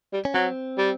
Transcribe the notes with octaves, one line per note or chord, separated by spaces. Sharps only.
G3
C#4
F#3 C4
G3